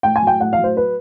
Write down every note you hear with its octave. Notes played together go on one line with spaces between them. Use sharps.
A2 G5
G#5
F#3
G5
A2 F#5
F5
F#3
C5
B4